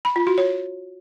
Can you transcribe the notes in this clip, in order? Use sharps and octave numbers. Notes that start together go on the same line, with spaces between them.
B5
F4
F#4
C#5